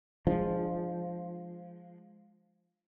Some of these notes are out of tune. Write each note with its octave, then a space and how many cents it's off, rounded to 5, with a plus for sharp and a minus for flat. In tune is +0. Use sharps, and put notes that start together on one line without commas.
F3 +0 G#3 +0 D4 +40